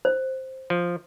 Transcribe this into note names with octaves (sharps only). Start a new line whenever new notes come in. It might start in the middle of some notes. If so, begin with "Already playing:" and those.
C5
F3